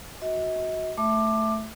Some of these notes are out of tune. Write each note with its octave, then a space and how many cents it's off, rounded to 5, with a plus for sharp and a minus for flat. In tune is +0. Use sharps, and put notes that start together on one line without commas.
F#4 -5 D#5 +45
A3 +0 E5 +0 D6 +15